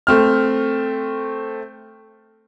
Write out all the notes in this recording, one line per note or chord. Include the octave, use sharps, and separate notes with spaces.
A3 C4 F6